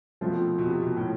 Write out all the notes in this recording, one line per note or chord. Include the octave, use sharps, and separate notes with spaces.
B2 F3 A3 C4 F4
B2
C3
B2
A2